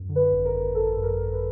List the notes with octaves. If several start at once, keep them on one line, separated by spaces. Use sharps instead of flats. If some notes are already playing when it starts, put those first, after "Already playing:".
Already playing: F#2
D3
B4
G#1
A#4
G#1
G#1 A4
F#2
A#4
G#1
B4